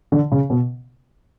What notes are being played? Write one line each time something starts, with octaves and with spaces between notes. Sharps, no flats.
D3
C#3
B2